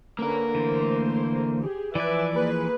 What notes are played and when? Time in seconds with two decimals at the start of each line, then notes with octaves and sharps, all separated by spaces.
0.19 D3 A#3 C#4 A#4 B4
0.55 D3 E3 A3 C5
1.59 G4 G#4
1.95 E3 F3 B4 D5 E5 G#5
2.34 A#3 G#4 B4